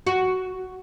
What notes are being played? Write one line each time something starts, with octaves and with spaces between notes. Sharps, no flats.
F#4